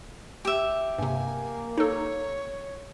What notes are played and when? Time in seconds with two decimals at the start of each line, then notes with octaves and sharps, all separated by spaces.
0.45 G4 E5
0.98 G2 C3 A#3 G#5
1.78 D#4 A4 C#5